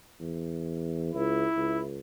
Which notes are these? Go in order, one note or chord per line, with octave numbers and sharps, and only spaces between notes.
E2
C#2 E4
C#2